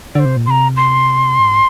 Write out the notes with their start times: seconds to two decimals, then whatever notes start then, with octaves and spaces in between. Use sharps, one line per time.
0.15 D3 C5 D5
0.25 C3
0.37 A#2
0.46 C3 A#5 C6
0.77 C6
1.39 G#2